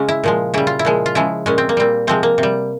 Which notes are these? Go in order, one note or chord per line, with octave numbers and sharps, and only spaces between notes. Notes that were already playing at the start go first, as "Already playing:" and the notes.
Already playing: C#3 G#3 C#4
E4
A#2 F3 G#3
C#3 G3 E4
F4
E4
A#2 F3 G#3
F4
C#3 F3 G#3 E4
A#2 G#3 C#4
C4
A#3
A#2 G3 C4
C3 F3 G#3 C4
A#3
C3
G3